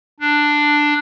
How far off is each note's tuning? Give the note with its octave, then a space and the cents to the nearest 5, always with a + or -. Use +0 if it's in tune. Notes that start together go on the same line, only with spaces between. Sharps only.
D4 +5